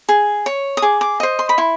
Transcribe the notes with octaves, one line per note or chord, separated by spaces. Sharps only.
G#4
C#5
D#6
G#4 D6
D6
C5 D#5
C6
B5
E4 C6